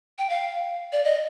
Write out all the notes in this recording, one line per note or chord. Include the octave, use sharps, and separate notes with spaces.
G5
F5
D5
D#5